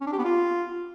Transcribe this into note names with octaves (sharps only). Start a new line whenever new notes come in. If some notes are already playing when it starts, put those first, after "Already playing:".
C#4
D4
G4
B3
F4